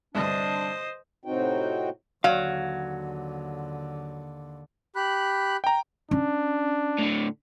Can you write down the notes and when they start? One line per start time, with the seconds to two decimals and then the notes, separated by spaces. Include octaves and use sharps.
0.15 C2 G2 D3 D4 C5 D#5
1.25 A2 C3 C4 D#4 F#4 G5
2.24 D#2 D3 F#3 F5
4.96 G4 B5 F#6
5.64 G5 A#5
6.11 C#4 D4
6.98 A2 D3